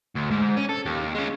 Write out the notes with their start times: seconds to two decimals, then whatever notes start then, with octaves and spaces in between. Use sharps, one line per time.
0.15 D2
0.31 G#2
0.57 C#4
0.69 A4
0.86 D#2
1.15 G#3 C#4